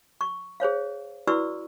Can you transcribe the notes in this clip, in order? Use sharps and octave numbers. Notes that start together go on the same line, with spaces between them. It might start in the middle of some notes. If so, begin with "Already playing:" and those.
C#6
G#4 C5 C#5 F5
E4 F#4 B4 D5 C#6 E6